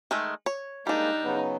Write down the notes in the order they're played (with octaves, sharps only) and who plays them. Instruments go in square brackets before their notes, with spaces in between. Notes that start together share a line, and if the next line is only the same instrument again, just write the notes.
[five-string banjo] D#3 G#3 A3
C#5
[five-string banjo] G3 D4 [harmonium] G#3 A#3 [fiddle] D#4
[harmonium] C#3 F#3 B3